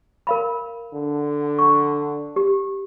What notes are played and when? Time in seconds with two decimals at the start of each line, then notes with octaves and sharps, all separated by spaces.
0.27 A#4 F5 B5
0.93 D3
1.59 C#6
2.36 G4